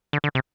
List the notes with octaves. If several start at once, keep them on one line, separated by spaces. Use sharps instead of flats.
D3
D3
C3